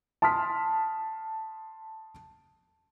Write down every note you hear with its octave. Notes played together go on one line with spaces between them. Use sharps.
A5 C6 D#6 F6 B6